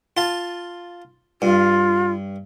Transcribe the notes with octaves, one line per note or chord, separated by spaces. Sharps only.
F4 A5
G2 F4